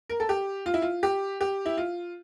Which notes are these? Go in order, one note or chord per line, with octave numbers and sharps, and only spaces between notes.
A#4
A4
G4
F4
E4
F4
G4
G4
E4
F4